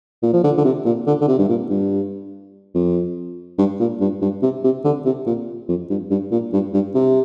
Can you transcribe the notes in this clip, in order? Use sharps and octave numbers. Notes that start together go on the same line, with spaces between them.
A#2
F3
D3
D3
C3
A#2
D3
D3
C3
G2
A#2
G2
F2
G2
A#2
G2
G2
C3
C3
D3
C3
A#2
F2
G2
G2
A#2
G2
G2
C3